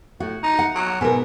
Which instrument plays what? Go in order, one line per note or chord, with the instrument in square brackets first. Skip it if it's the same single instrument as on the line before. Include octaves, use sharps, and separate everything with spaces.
[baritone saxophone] A2 [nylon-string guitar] F#4
[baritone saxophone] D#4
[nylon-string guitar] F#5
[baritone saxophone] F#3
[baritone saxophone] G#2 [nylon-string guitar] B2 A#4